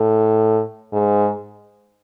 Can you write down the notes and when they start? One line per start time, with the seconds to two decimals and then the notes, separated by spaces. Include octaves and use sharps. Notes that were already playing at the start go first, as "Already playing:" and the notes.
Already playing: A2
0.93 G#2